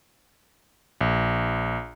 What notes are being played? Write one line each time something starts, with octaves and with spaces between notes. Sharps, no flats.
A#1